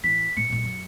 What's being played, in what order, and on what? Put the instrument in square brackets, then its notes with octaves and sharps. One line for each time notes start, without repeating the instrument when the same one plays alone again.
[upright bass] A1 E3 [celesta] B6
[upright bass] A2 [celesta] C#7
[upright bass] A1 A#2
F#2